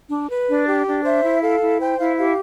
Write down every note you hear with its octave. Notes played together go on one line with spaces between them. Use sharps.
D4
B4
D4
G4
D4
C5 E5
E4
A4 F5
E4
C5 G5
E4 F5
G4 F5